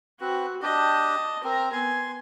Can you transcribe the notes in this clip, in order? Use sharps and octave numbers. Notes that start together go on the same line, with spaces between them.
C4 F#4 B4
D4 G4 D#5 A5
C4 A#4 A#5
B3 G#5 C6